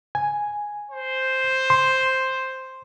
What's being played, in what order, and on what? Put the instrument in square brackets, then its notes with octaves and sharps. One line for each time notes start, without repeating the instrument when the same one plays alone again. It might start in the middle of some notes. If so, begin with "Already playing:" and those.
[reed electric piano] G#5
[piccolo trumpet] C5
[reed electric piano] C6